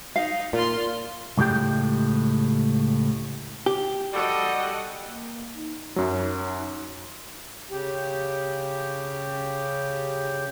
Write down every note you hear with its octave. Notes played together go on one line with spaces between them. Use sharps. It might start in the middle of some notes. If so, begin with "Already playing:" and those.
D#4 F5
A#2 F4 C6
C#2 A2 G#3 G4 G5
G4
G3 F#4 A4 D#5
A#3
D#4
F#2 F#3
C#3 G4